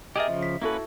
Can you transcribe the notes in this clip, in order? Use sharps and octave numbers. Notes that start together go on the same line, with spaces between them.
G4 G#4 A#4 D#5 E5
C#3 F3
B6
A#3 C#4 E4 F#4 A4 B4